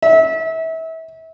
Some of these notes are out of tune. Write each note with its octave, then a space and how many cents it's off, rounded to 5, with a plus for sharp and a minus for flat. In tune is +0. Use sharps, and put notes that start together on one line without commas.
E5 -30